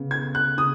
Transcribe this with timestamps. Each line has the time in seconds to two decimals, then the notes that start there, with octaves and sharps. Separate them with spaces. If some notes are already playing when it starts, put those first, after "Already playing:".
Already playing: C#3 B3
0.11 G#6
0.35 F#6
0.58 C#3 D#6